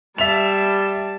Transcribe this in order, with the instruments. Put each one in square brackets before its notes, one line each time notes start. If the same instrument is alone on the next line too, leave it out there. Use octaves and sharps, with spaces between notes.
[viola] G3 A5 [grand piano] E5 F7